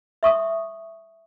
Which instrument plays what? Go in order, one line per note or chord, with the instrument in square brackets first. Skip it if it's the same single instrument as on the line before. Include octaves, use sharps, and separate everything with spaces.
[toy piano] E5 C#6 D#6